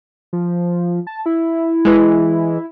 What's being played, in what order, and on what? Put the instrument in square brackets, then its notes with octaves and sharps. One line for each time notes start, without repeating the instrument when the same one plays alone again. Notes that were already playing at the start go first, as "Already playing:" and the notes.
[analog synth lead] F3
A5
E4
[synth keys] E3 G#3